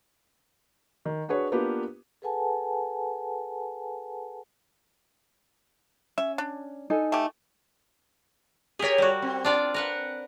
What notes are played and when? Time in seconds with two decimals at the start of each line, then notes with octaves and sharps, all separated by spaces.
1.05 D#3
1.28 D4 F#4 G#4 B4 C#5
1.52 A#3 B3 D4 F4 G4 B4
2.22 G#4 A4 B4 F#5 G#5 A5
6.18 C#4 E5
6.38 D4
6.90 D#4 A4 G#5
7.12 A3 G4
8.79 G4 G#4 A#4 C#5
8.98 G3 F#4
9.22 C4
9.45 D4 F4 D5
9.74 A#4 B4 F#5